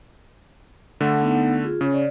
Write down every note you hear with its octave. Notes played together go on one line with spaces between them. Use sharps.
D3 A3 F#5
B3 D#4 F#5
F4 G#4
C#3 C#4 C#5
D5